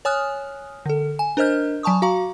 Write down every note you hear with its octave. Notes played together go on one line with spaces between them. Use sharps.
C#5 G#5 D#6 F6 F#6
D3 A4
G#5
D4 A#4 C5 D#5 F6 G6
F#3 G#5 A5 C#6 D#6
F#4 F5 A#5 C#6